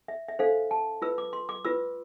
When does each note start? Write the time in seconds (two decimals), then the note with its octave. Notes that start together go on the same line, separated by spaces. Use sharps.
0.08 E5
0.28 E5
0.39 D4 A4 C5 F5
0.71 A5
1.02 F4 B4 E6
1.18 D6
1.33 C6
1.49 D6
1.65 F4 B4 E6